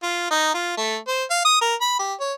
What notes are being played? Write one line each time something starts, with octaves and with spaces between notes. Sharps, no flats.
F4
D#4
F4
A3
C5
F5
D#6
A#4
B5
G4
C#5